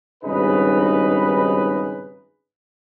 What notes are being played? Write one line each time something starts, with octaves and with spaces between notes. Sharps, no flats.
G#1 G2 C#3 D#4 B4